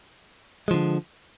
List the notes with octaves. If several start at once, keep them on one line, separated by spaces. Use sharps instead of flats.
D3 F3 G#3